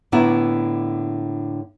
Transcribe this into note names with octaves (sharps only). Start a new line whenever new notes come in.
A2 D3 A#3 B3 E4 F#5